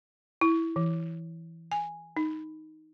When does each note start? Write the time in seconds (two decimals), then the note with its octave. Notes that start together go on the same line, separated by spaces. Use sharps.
0.41 E4
0.76 E3
1.72 G#5
2.17 D#4